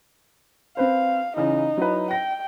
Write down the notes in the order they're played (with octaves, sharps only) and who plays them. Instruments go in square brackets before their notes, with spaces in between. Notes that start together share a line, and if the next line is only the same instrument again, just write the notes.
[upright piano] C4 B4 C5 [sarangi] F5
[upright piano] C#3 E3 [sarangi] D#4
[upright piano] F#3 E4 B4
[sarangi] G5 [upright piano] A#6